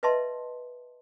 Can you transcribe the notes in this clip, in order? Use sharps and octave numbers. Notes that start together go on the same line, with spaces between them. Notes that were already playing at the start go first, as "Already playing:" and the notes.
B4 D#5 E5 A5 C6